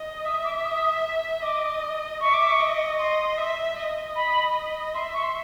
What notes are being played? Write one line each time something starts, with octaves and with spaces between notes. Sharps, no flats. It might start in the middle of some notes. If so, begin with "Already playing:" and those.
Already playing: D#5
E5 D#6
D6
D6
D#6
D#5 D6
E5 C#6
D6
C#6
D#5
D#5 C6
E5
D#5
B5
E5 C6
C#6
C6